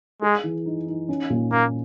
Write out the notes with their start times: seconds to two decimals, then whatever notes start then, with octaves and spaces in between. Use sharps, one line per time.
0.22 G#3 G#4
0.44 E3
0.66 D#4
0.87 D#4
1.09 C#4
1.30 A#2
1.52 A#3 C#4